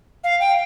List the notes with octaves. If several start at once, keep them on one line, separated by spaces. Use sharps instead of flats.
F5
G5